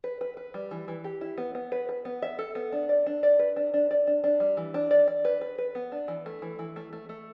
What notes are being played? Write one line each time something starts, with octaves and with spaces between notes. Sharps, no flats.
B4
B4
B4
G3
E3
E3
G4
E4
B3
B3
B4
B4
B3
E5
A4
B3
D4
D5
D4
D5
B4
D4
D4
D5
D4
D4
G3
E3
D4
D5
D5
B4
B4
B4
B3
D4
E3
A3
E3
E3
A3
A3
A3